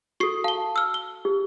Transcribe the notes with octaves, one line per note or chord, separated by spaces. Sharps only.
F#4 A4 C#6 C7
F5 A5 G7
E6 F6
G7
G4